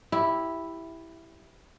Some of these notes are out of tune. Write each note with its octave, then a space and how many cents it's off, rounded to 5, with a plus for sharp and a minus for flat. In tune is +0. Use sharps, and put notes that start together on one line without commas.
E4 +0 G4 +0